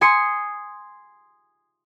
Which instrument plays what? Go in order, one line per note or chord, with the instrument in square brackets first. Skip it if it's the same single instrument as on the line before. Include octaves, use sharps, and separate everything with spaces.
[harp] G#5 C6 D#6 C#7